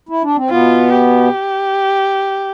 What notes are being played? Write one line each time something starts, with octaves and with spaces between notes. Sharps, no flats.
E4
D4
C4
B2 B3 F4
G4